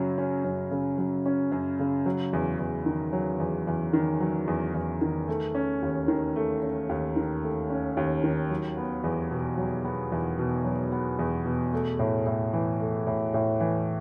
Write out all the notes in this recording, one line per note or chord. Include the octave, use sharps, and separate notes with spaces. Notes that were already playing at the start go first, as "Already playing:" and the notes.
Already playing: F#2 C#3 F#3 C#4
C#4
F#2
C#3
F#3
C#4
F#2
C#3
F#3
E2
E2
D#3
F#3
E2
E2
D#3
F#3
E2
E2
D#3
A3
C#4
D#2
D#3
A3
C#4
D#2
D#3
A3
C#4
D#2
D#3
F#3
B3
E2
B2
F#3
B3
E2
B2
F#3
B3
E2
B2
A3
A2
A2
E3
A3
A2
A2
E3